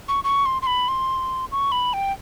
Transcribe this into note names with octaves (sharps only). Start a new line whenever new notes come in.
C#6
C#6
C6
C6
B5
C6
C#6
B5
G5